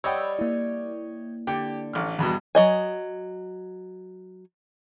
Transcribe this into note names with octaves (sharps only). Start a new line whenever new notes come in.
G3 C#5 D#5 F#5 G5 B5 E6
A#3 E4
D3 G4 G5
A1 F6
E2 G2 B2
F#3 D#5 G#5